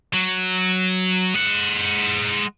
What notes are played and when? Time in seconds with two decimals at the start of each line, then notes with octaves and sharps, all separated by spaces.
0.14 F#3
1.34 G#3 F#5